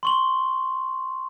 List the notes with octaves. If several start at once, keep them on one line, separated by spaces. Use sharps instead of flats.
C6 C#6 F#7